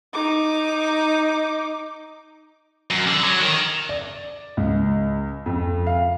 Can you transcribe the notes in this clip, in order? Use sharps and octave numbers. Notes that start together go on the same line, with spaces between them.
D#4 D6
F#2
D3
F#3
D#3
D5
C#2
F2
F5